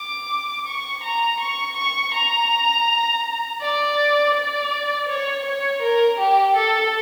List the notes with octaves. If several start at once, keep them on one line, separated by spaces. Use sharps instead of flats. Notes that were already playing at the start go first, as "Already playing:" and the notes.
Already playing: D6
C#6
A#5
C#6
C#6
A#5
D5
D5
C#5
C#5
A#4
G4
A4